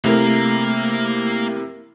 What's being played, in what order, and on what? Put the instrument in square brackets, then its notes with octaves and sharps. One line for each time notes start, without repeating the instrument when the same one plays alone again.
[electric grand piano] C3 E4 A#4 [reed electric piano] A3 [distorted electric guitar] A#3 A#5